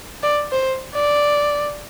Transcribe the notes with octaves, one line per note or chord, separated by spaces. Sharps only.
D5
C5
D5